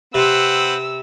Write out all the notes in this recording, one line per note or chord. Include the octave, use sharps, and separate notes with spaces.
C3 C4 B4 F#5 E6